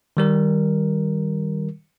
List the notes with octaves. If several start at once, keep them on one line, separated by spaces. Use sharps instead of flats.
D#3 G3 A#4